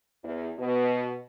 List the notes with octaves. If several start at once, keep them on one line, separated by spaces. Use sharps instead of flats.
E2
B2